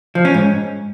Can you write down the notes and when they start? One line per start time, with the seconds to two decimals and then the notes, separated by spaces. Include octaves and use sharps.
0.15 F3
0.25 C#4
0.34 G#2